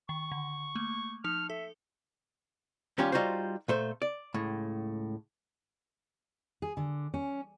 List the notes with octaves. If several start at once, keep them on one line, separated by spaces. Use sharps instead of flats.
D#3 C#6
D3
A3 A#3
F3 D#4 F6
A4 E5
D#2 G3 C#4 F4 G4
G3 D#4 F4 F#4 C5
A#2 A3 C5
D5
C#2 A2
G#4
D3
C#4